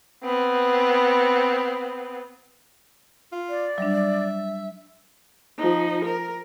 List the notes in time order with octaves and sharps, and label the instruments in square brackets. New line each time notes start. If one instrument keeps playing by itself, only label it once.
[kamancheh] B3 C4
[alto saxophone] F4
[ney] D5
[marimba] F#3 G3 D4 [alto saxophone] E5
[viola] F3 D#4
A#4